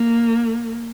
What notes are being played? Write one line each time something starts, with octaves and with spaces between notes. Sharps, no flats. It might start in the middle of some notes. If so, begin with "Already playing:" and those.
Already playing: A#3